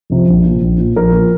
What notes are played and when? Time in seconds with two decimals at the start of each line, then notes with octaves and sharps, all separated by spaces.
0.10 F2 C3 F3
0.28 A#1
0.44 A#2 F3
0.62 A#1
0.78 A#2 F3
0.96 A#1 A#4
1.12 A#2 F3